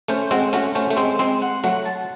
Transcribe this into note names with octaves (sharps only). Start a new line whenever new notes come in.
A3 C#4 C5
G#3 C4 F#4
A3 C#4 F#4
A3 C#4 C5
A3
G#3 C4 C5
G#3 C4 C6
F#5
F#3 A3 F#5
A5